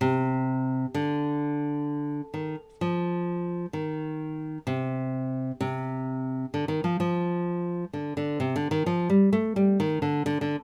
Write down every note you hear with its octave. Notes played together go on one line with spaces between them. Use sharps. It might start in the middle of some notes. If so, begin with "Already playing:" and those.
C3
D3
D#3
F3
D#3
C3
C3
D3
D#3
F3
F3
D3
D3
C3
D3
D#3
F3
G3
A3
G3
D#3
D3
D3
D3